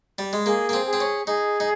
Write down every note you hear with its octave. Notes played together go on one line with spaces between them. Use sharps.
G3
G#3
A#3 G#4
A#3
C4
G#4
C4
C#4
D#4 G#4
D#4